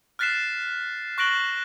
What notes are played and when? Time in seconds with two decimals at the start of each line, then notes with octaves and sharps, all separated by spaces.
0.19 F6 F#6 A6 B6 C7 E7
1.18 C#6 F#6 A#6 D7 F#7 G7